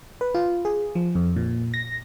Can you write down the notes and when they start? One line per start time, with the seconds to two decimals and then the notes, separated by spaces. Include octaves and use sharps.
0.21 B4
0.34 F4
0.65 G#4
0.95 F3
1.15 F2
1.36 A#2
1.74 A#6